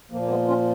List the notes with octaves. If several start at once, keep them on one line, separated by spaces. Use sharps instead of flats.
A#2 F3 A#3
A#3
G#3 B3
C#4 F4